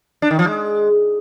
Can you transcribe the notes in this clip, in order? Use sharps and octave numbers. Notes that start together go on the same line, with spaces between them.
D4
D#3
F3
G#3